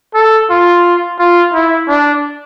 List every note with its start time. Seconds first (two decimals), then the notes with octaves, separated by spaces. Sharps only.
0.15 A4
0.50 F4
1.19 F4
1.54 E4
1.88 D4